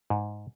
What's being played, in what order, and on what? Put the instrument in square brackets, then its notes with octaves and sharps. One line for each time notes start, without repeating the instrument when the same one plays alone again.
[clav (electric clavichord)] G#2